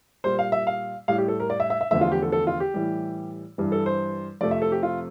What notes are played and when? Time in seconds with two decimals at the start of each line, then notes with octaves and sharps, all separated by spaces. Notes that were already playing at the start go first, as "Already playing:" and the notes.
0.24 A#2 G3 C5
0.39 F5
0.52 E5
0.67 F5
1.08 A2 G3 F5
1.18 G4
1.28 A4
1.40 A#4
1.50 D5
1.60 E5
1.70 E5
1.81 E5
1.91 E2 D3 F3 A3 E5
2.01 F4
2.12 G4
2.22 A4
2.32 A4
2.47 F4
2.60 G4
2.74 A2 E3 G3
3.58 G2 E3 G3
3.72 A4
3.86 C5
4.41 F2 C3 F3 A3 D5
4.51 E5
4.62 A4
4.72 G4
4.83 F4